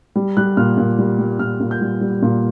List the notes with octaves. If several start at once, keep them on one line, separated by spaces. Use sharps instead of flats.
G3
G3 F#6
A#2 F6
A#2
G3
G3
A#2 F6
A#2
G6
G3
G3
A#2